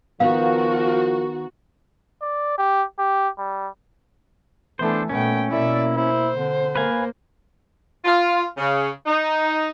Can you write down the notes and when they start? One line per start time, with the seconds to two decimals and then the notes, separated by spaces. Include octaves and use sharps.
0.20 D#3 F3 B3 F#4 A#4 F5
2.22 D5
2.58 G4
2.99 G4
3.38 G3
4.79 E3 A3 B3 D4 A4 C5
5.09 A#2 A3 B3 C#4 G5
5.51 B2 A#3 E4 D5 E5
5.96 E4 C5
6.35 D3 C4
6.76 A#3 B4 F5 G#5
8.05 F4
8.58 C#3
9.06 D#4